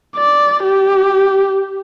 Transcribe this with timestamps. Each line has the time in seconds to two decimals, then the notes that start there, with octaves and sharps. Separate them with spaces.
0.16 D5
0.64 G4